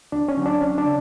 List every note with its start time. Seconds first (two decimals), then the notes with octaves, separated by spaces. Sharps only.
0.12 D2 D4
0.28 C#4
0.37 D3 F#3
0.46 D4
0.61 D2 C#4
0.78 D4
0.85 C#3